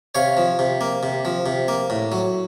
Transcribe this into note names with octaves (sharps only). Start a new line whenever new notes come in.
C3 C#5 F5
F3
C3
A#3
C3
F3
C3
A#3
A2
F#3